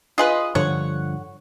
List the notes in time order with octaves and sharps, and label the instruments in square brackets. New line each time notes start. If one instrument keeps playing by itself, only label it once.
[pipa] F4 G#4 B4 [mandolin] D#5 C6
[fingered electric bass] G2 D3 F3 [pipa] C#5 [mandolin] F#5